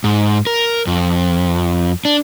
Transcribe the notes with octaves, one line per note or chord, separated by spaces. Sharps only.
G#2
A#4
F2
D4